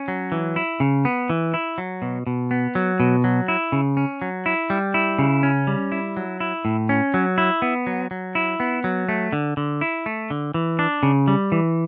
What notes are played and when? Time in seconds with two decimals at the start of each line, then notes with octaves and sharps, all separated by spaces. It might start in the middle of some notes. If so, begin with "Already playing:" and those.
Already playing: C#4
0.08 F#3
0.32 E3
0.56 E4
0.80 C#3
1.05 B3
1.30 E3
1.54 E4
1.78 F#3
2.02 B2
2.27 B2
2.51 B3
2.75 F#3
3.00 B2
3.24 F#3
3.48 E4
3.72 C#3
3.97 C#4
4.22 F#3
4.46 E4
4.70 G3
4.94 E4
5.19 C#3
5.43 C#4
5.67 G3
5.92 E4
6.17 F#3
6.40 E4
6.65 A2
6.89 C#4
7.14 F#3
7.38 E4
7.62 B3
7.87 F#3
8.11 F#3
8.35 E4
8.60 B3
8.84 F#3
9.09 A3
9.33 D3
9.57 D3
9.81 E4
10.06 A3
10.30 D3
10.54 E3
10.79 D4
11.03 C#3
11.28 G3
11.52 E3